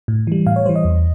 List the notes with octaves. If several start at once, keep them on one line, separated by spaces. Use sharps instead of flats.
A2
E3 G3
A2 F5
C#5
E3 G3 C5
D#5
E2